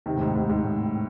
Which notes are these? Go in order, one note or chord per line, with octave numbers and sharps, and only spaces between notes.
C3 D#3
A2
G#2 C3
G#2
G#2
A2